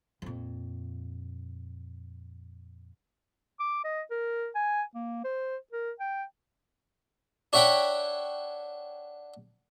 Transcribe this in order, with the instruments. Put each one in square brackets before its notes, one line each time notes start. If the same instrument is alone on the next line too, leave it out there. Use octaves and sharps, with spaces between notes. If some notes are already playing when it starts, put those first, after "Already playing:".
[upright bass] F2 A#2
[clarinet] D6
D#5
A#4
G#5
A#3
C5
A#4
G5
[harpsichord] D4 C#5 E5 F#5 G5 B5